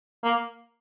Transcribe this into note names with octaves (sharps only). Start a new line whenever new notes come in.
A#3